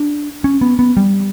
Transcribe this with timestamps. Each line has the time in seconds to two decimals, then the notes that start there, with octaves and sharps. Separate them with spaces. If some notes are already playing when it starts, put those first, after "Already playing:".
Already playing: D4
0.44 C#4
0.61 B3
0.79 B3
0.97 G3